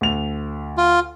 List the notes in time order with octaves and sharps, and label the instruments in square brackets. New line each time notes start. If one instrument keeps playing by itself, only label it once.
[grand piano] D2 F7
[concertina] F4